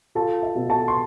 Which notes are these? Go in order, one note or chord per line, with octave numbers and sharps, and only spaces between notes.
F4 A4 A5
E5
B2
A4 A5
C6